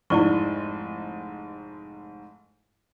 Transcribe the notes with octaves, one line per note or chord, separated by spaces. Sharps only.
F1 G#2 E4 D5 C#6